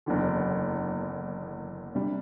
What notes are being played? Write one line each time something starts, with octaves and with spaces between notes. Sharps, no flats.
F#1 E2 D3
C3 G3 D4